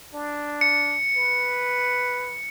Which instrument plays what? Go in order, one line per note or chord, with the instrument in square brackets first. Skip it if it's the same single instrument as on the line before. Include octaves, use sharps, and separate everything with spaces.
[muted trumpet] D4
[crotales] C#7
[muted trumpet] B4